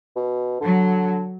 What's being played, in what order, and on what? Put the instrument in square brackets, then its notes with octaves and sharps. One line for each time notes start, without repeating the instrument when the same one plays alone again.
[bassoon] B2
[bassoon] D3 [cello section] F#3